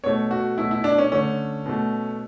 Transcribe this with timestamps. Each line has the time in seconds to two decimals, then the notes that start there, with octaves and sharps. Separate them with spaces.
0.04 B2 A3 C#5
0.31 F#4
0.58 B2 F#3 A3 E4
0.71 E4
0.84 D4
0.98 C#4
1.12 D3 A3 C#4
1.66 B2 A3